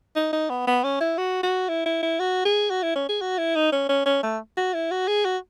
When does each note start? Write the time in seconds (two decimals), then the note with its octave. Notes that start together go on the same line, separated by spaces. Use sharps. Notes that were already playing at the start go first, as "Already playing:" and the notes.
0.16 D#4
0.33 D#4
0.50 B3
0.67 B3
0.84 C#4
1.01 E4
1.18 F#4
1.43 F#4
1.69 E4
1.86 E4
2.03 E4
2.20 F#4
2.45 G#4
2.70 F#4
2.83 E4
2.96 C#4
3.09 G#4
3.21 F#4
3.38 E4
3.56 D#4
3.72 C#4
3.89 C#4
4.06 C#4
4.23 A3
4.57 F#4
4.74 E4
4.91 F#4
5.08 G#4
5.25 F#4